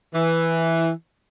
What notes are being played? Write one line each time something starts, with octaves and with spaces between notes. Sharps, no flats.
E3